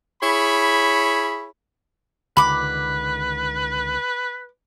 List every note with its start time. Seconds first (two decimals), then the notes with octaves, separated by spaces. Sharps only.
0.22 E4 G#4 C#5 B5
2.37 C#2 D3 D#3 B4 B5 D6